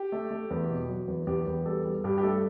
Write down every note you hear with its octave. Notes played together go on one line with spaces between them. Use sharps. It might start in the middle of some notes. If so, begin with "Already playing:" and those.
Already playing: G4
A3
A3
E2
B2
F#3
E2
E2 G4
E2
G3 A4
G3
G2 G4
G4
A3 A4